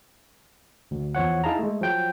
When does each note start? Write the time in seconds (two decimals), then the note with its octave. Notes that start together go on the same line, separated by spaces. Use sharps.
0.91 D2
1.15 E2 F3 C#5 F#5
1.44 D#4 E4 G#4 F5 A5 A#5
1.59 G#3 A3
1.81 F3 F#3 G5 G6